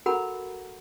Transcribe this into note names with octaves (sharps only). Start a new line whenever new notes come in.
F#4 A4 A#4 F#5 A#5 B5